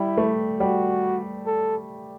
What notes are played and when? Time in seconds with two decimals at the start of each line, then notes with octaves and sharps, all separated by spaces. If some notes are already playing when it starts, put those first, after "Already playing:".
Already playing: G3 E4
0.17 A3
0.60 G3 F#4
1.46 A4